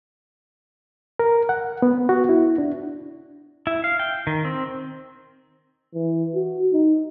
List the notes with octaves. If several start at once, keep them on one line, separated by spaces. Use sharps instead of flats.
A#4
F#5
B3
F#4
E4
D4
E4
F5
G5
D#3
C4
E3
F#4
D#4